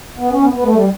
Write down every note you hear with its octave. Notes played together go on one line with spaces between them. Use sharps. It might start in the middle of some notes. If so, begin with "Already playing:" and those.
B3
C#4
B3
B3
A3
G3